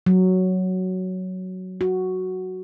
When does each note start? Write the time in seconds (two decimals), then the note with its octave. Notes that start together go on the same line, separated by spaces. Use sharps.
0.06 F#3
1.81 F#4